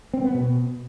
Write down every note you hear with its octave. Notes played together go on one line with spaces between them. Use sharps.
C4
B3
B2